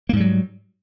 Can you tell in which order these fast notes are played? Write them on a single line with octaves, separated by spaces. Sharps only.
A#3 G#2 G3 F#3